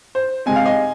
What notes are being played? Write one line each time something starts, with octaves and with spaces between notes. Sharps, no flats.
C5
C3 G#3 C4 G#5
F5
D#5 G#5